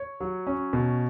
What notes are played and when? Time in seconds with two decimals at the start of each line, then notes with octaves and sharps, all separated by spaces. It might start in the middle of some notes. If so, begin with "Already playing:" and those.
Already playing: C#5
0.20 F#3
0.47 C#4
0.73 B2